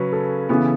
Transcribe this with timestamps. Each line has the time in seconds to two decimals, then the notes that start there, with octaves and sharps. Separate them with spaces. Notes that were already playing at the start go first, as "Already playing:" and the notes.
Already playing: C#3 F#3 C#4 F#4 B4
0.13 A4
0.49 C#3 E3 B3